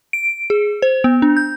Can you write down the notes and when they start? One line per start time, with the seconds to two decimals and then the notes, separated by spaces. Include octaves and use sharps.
0.13 D7
0.50 G#4
0.82 C5
1.04 B3
1.22 D4
1.37 G6